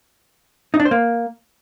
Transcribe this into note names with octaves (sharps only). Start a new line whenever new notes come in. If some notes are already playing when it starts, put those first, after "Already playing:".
D#4
D4
C5
A#3